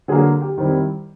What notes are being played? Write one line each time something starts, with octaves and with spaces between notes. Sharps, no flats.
D3 F#3 A#3 G#4
G4
D#3 G3 C4 E4